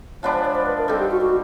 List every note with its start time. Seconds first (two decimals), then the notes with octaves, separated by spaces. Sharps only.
0.23 F3 G#3 B3 D4 C#5
0.33 C5
0.45 C#5
0.55 C5
0.66 B4
0.78 A#4
0.88 G3 C4 D#4 A4
1.00 G4
1.11 F#4
1.21 F#4